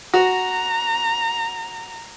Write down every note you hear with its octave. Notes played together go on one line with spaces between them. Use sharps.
F#4 A#5